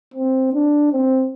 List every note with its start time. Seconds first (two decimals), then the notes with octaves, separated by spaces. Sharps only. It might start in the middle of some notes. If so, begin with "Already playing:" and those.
0.14 C4
0.53 D4
0.92 C4